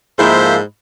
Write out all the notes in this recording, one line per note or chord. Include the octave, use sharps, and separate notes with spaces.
G#2 F3 A#3 E4 G#4 A4 C5 E5